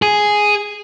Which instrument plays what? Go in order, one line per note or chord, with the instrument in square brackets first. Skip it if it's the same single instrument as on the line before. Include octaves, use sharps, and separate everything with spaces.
[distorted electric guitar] G#4